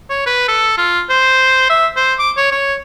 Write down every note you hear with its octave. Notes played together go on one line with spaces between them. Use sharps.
C#5
B4
A4
F4
C5
E5
C5
D6
C#5
C#5